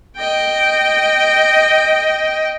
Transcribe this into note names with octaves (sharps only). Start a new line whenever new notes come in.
D#5 G5